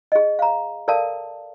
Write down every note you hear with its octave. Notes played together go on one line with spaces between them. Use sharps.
G#4 D#5
F5 A#5
A4 A#4 D5 F5 A5